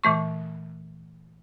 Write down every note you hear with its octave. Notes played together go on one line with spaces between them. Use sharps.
A#2 E3 A3 C#6